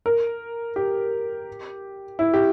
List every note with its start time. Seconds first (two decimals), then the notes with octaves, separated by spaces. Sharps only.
0.06 A#4
0.76 G4
2.19 E4
2.33 G4